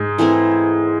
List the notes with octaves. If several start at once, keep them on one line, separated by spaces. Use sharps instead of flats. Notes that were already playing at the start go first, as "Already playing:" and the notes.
Already playing: G#2
E3 A3 C4 E4